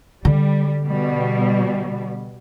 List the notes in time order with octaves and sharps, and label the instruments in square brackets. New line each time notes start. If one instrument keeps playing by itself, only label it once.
[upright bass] D3 [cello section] G3
[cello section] B2 G3